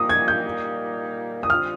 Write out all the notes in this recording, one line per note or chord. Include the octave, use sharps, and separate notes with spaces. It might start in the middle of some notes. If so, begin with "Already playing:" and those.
Already playing: A#2 G3 A#3 D#4 D#6
G#6
G6
D#6
D3 G3 C4 F4 F6